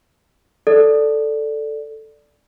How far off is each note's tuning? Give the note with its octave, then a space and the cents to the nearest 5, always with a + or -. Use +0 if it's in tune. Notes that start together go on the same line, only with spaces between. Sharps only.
A4 +0 D5 +0